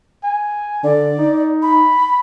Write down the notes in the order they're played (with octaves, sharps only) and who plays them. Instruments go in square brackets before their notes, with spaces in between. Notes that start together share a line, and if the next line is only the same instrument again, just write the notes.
[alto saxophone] G#5
[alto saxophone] D3 [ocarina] D5
[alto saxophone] D#4
[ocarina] B5